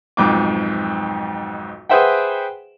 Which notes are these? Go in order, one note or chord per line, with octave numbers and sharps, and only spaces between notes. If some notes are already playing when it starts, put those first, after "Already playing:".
B1 F2 G#2 D6
G#4 B4 C5 E5 F#5 G5